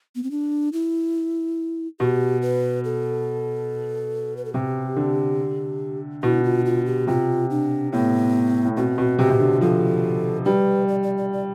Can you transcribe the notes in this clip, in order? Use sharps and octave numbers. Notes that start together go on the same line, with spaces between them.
B3
C4
D4
E4
B2 G4
B4
A4
B4
A4
C3 G4
D3
B2 E4
F4
F4
G4
C3 F4
D4
A2 B3
A2
B2 C4
B2
C3 G4
C3
D3
F3 A4
G3 B4
D5
D5
D5
D5